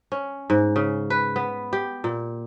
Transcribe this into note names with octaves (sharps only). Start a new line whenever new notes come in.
C#4
G#2
C#3
B4
B3
G4
A#2